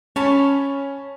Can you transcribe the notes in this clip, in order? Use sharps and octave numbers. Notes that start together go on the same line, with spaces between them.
C#4 C#5 A5 B5